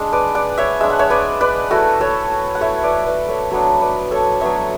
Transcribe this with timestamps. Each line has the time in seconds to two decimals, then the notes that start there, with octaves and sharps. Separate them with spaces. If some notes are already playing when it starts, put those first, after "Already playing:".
Already playing: G#3 D4
0.13 B4 D5
0.35 D5 F#5
0.58 C#5 E5
0.80 G#3 D4 E5
0.90 F#5
0.99 C#5 E5
1.10 B4 D5
1.41 B4 D5
1.71 A3 E4 F#4 A4
2.01 A4 C#5
2.55 F#5
2.61 A3 E4 C#5 E5
2.83 B4 D5
3.06 B4 D5
3.29 A4 C#5
3.51 F#3 B3 D4 A4 C#5
3.81 B4 D5
4.11 A4 C#5
4.41 F#3 B3 D4 C#5 E5